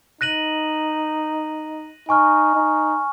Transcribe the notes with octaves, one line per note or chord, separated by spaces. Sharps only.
D#4 F#6 A#6 D#7 F#7
D#4 G#5 C#6 F6
D#4